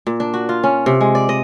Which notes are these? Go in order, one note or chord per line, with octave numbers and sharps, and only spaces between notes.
A#2
D4
F#4
F4
C#4
C3
G#3
D5
D#5